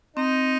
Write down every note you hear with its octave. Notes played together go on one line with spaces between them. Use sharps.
C4 D#4